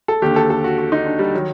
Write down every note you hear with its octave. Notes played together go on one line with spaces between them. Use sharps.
A4
D#2 D3 G4
A4
A4
F#4
F#4
D#4
D4
G3
D#3 F#3